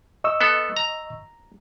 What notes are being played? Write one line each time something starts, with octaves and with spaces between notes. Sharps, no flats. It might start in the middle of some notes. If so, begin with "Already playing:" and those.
D#5 C#6 E6
B3 A4
A#5